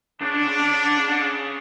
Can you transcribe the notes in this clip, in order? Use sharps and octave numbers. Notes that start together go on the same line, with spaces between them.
C#3 D4
D3
C#3
D3
C#3
D3
C#3
D3
C#3